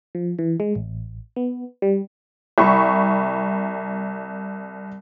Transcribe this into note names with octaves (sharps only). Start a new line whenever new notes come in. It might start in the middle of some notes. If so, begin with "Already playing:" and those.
F3
E3
G#3
A1
B3
G3
C2 B5 C#6